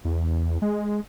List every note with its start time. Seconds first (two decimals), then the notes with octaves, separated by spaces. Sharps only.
0.05 E2
0.62 G#3